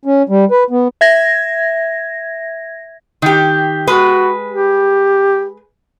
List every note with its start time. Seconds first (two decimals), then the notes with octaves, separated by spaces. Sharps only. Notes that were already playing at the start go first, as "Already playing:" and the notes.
0.05 C#4
0.29 G3
0.51 B4
0.70 B3
1.01 E5 G#6 A#6
3.22 D#3 G4
3.87 G#3 F#4 B4
4.51 G4